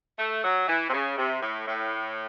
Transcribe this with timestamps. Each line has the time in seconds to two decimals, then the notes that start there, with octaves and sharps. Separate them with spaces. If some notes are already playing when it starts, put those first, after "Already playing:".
0.19 A3
0.44 F#3
0.68 E3
0.89 C3
0.93 C#3
1.18 C3
1.42 A2
1.67 A2